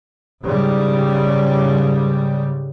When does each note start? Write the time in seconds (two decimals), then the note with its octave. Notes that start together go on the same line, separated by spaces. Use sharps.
0.45 G#2 C#3 G3